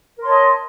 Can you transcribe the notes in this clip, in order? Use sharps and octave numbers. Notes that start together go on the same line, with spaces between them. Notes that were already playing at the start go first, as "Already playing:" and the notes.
A#4 C#5 D#5 A5 C6